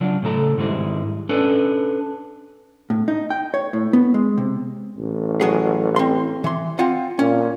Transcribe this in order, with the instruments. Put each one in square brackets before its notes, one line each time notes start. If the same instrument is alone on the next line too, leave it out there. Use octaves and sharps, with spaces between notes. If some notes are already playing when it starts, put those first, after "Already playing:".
[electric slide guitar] C#3 F#3 D4 F4
A2 C#3 A4 A#5
G#2 D#3 G3 G#3 E4
C#4 D4 A4 B4
[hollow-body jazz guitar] A2
D#4
G5
C#5
A2
B3
G#3
C3
[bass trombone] A1
[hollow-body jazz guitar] F#3 F#4 G#4
C4 C6
E3 C6
C4 F4 F#5
[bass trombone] A#2 [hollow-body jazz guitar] C#4